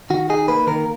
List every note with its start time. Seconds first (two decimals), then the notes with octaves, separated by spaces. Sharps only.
0.10 D#3 F#4
0.29 D#4 G#4
0.48 A#3 B4
0.67 D#3 A#4